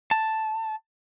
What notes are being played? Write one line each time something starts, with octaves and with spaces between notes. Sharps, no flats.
A5